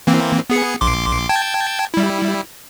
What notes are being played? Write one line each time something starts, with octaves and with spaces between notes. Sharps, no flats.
E3 A#3 C4
B3 G#4 C#7
A#1 C6 D6
G5 A5 G#6
G3 E4